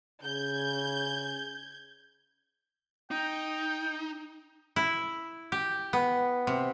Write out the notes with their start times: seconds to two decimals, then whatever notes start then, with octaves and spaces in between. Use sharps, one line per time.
0.23 C#3 G6 G#6
3.11 D#4 G5
4.76 E4
5.52 G4
5.93 B3
6.47 C3